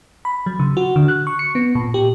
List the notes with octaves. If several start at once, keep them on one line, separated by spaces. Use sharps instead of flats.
B5
F#3
C#3
F#4
D3
F#6
C#6
C#7
B3
A#2
G4